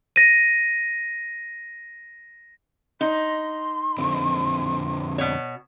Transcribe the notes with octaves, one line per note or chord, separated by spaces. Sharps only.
A#6 D#7
D#4 C6
F2 D3 C4
B2 C#5